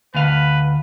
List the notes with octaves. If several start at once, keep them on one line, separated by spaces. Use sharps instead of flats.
D2 B4 F5